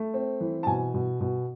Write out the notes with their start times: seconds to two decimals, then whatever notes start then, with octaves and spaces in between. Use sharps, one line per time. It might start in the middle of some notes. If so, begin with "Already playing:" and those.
Already playing: A3
0.14 C4
0.40 E3
0.63 A5
0.67 B2 G#5
0.94 B2
1.21 B2